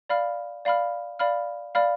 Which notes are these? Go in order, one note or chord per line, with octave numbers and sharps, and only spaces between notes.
D5 F5 B5 F6
D5 F5 B5 F6
D5 F5 B5 F6
D5 F5 B5 F6